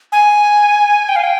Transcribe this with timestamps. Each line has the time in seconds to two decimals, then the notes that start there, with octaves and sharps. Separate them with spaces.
0.12 G#5
1.09 G5
1.16 F5
1.24 G5